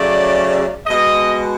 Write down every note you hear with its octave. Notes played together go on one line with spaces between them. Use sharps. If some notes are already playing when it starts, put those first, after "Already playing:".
Already playing: C#3 F#3 A3 D5
B2 G#3 D#5